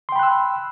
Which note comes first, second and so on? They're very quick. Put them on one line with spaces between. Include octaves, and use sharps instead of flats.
C6 G5 B5 F#6 E6